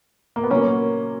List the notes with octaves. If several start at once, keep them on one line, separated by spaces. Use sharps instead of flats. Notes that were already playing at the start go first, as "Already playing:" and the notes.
A#3
B3
A#2 F#3 A#3 C#4